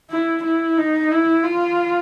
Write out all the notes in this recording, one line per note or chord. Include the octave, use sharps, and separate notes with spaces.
E4
E4
D#4
E4
F4